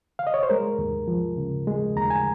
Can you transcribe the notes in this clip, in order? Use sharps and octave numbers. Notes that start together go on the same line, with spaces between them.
F5
D#5
C#5
C5
G#3 A#4
D#2
F3
C#3
G#3
D#2 A#5
G#5